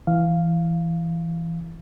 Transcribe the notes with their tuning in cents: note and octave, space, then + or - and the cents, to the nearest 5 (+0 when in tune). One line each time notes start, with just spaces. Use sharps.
E3 +10 F5 +0